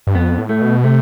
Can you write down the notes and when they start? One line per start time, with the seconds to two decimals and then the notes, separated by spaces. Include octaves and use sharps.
0.07 G2
0.15 F2 B3
0.39 A2
0.49 A3
0.62 B2
0.84 C3 A3